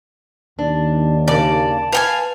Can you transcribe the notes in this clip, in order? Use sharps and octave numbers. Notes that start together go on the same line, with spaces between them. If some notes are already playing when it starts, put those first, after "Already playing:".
D#2 D4
C#3 A#3 D5 A5
B4 F5 G5 G#5